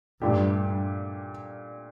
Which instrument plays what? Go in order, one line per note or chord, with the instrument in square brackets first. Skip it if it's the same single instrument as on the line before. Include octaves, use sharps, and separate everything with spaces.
[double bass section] G2 [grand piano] A#2 A3 D4 G4